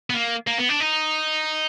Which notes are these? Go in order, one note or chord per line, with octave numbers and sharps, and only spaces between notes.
B3
A#3
A#3
B3
D4
D#4